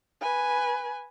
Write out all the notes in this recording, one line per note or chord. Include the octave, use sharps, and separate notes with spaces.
B4 G#5